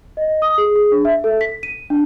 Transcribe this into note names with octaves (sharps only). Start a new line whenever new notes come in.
D#5
D#6
G#4
G#4
D4
E5
A4
B6
D#7
D4